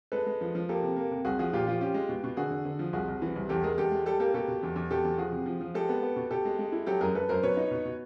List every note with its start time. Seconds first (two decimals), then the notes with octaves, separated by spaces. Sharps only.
0.12 G#3 A4 B4
0.26 G#3
0.41 F3
0.55 F3
0.69 A#3 G4 A4
0.82 C3
0.96 A#3
1.11 C3
1.25 C2 F#4 G#4
1.39 F3 F#4 G#4
1.53 A#2 F4 G4
1.67 F3 F4 G4
1.81 C#4 F4 G4
1.94 G#3
2.09 B2
2.24 B2
2.37 D3 F#4 G#4
2.51 D3
2.65 D3
2.79 F3
2.93 C2 F#4 G#4
3.08 C2
3.22 E3
3.36 C2
3.49 E2 G4 A4
3.64 G#3 G#4 A#4
3.78 E2 G4 A4
3.92 G#3
4.06 G3 G4 A4
4.20 A#3 G4 A4
4.34 B2 G4 A4
4.48 B2
4.63 E2
4.76 E2
4.90 B2 G4 A4
5.05 E2
5.18 F3 F#4 G#4
5.32 C3
5.46 F3
5.61 F3
5.74 G#3 G4 A4
5.89 B3
6.03 B3
6.16 B2
6.31 B2 G4 A4
6.45 G#3
6.59 G#3
6.72 E4
6.86 F#3 G4 A4
7.01 F#2 G#4 A#4
7.15 F#2 A4 B4
7.29 F#2 A#4 C5
7.43 B2 B4 C#5
7.57 D#4
7.71 B2
7.85 B2